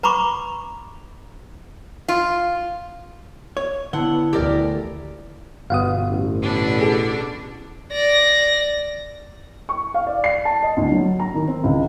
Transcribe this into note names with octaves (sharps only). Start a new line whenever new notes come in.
B4 A#5 B5 C#6 D6
F4
C#5
D3 B3 E4 F#5
D2 E3 G4 A#4 D5
G1 B2 F5 F#5 D#6
A1
B2 D3 D4
G#4
D5 A#6
C#6
F5
D5
C7
A5
D#5
D2
F#3
A#5
D#3
C4
C#2